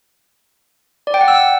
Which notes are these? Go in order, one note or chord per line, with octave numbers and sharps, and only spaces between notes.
D5
G5
F#5
E6